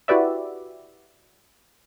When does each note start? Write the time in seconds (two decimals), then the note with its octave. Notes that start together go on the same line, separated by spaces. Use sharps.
0.08 E4 F#4 G4 B4 D5 E5